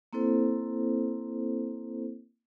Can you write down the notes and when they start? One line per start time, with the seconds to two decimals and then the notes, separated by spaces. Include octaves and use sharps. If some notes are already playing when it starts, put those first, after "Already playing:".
0.13 A#3 C4 E4 A4 C5